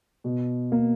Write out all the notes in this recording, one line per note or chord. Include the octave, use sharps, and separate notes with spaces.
B2
A#3